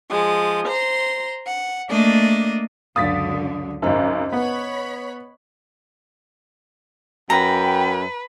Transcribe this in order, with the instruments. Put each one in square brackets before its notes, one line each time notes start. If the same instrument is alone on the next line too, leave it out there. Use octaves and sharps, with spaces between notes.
[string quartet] F3 G#3 D#6
C5 A#5 C6
F#5
A3 A#3 D4 D5 D#5
[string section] C#2 F#2 D3 [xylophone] F5 [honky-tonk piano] D#6 A6 B6
[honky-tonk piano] G#1 F#2 [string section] C#3 [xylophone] C5 D#5 A#5
[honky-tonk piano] B3 [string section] C#5 B5
[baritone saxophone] F#2 [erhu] B4 [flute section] G5 [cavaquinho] A#5